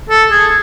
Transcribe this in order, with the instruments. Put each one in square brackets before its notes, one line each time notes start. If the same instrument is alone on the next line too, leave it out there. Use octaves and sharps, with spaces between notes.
[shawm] A4
G#4